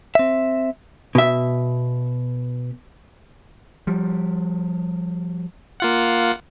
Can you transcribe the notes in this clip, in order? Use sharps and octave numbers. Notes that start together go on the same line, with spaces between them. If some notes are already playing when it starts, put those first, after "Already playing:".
C4 E5
B2 E5
F3 G3
A#3 F4 F#5